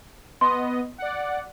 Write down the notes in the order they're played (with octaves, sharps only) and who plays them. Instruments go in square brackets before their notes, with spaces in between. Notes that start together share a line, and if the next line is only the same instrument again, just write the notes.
[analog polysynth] B3 D#5 [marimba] C6
[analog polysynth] D5 F#5